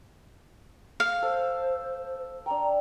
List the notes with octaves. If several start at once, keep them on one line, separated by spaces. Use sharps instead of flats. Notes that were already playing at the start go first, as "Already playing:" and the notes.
F5
A4 C5
D4 G5 A#5